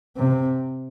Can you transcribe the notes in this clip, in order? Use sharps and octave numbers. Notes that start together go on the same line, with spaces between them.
C3